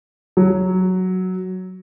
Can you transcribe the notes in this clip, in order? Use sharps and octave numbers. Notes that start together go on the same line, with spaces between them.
F#3